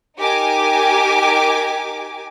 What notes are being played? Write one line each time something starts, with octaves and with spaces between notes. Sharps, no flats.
D#4 G4 A#4 G#5 D6